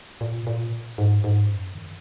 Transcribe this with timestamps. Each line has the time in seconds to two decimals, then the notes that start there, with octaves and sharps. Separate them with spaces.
0.21 A#2
0.47 A#2
0.98 G#2
1.24 G#2
1.49 F#2
1.75 D#3